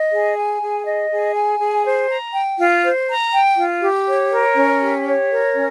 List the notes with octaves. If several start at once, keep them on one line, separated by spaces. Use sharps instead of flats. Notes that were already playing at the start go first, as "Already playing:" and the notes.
Already playing: D#5
G#4
G#5
G#4
D#5
G#4
G#5
G#4
C5
A#5
G5
F4
C5
A#5
G5
F4
G4
C#5
A#4
C#4
G4
C#5
A#4
C#4